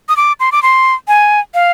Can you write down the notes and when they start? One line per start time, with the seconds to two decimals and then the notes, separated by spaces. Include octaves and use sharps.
0.09 D#6
0.17 D6
0.40 C6
0.52 D6
0.63 C6
1.08 G#5
1.54 F5